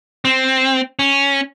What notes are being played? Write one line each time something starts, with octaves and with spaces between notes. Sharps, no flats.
C4
C#4